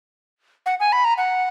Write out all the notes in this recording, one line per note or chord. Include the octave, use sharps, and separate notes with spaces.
F#5
G#5
B5
A#5
F#5